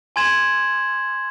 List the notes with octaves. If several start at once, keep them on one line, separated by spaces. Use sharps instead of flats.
G#5 C6 G#6 E7 F#7